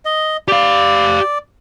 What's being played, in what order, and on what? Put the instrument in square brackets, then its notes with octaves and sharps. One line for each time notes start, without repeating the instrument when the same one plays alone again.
[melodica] D#5
[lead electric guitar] G4 F5 [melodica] D5